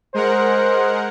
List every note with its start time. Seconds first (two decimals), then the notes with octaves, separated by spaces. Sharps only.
0.14 G#3 A#4 C5 F#5